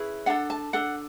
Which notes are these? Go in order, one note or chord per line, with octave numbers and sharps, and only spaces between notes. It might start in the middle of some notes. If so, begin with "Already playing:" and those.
Already playing: C#4 E4 G#4 B4
D4 A4 F#5
A5
D4 A4 F#5